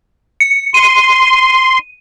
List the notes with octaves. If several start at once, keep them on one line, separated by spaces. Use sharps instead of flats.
C#7
C6 D#7